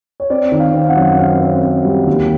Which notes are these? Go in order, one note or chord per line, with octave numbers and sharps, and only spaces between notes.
C#5
C4 D5
D#3
F5
C4
F5
F#5
F#2
C4 F5
C4
C4
G3
D#2